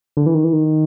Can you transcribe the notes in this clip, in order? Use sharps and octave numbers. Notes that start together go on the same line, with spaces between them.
D3
E3
D#3
E3
D#3